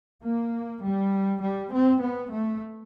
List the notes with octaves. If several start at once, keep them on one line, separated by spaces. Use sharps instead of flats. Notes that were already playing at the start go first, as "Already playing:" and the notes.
A#3
G3
G3
C4
B3
A3